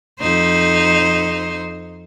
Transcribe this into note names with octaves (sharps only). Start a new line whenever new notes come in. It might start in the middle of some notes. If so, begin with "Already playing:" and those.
F2 D#4 C5